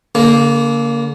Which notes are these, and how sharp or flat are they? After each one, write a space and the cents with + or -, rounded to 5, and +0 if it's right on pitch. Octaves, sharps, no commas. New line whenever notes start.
D3 -45 A#3 +0